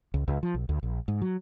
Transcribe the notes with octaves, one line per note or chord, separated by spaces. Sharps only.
C#2
C#2
F3
B1
D2
A#1
G#2
F#3